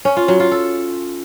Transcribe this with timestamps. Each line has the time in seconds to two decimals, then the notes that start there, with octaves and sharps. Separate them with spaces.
0.05 C#4
0.17 F4
0.28 F#3
0.40 F4
0.51 A4